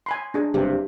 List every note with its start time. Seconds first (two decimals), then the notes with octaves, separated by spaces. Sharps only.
0.06 G#5 B5 C6
0.34 D4 G#4 G#5
0.54 F#1 G2 C3 G4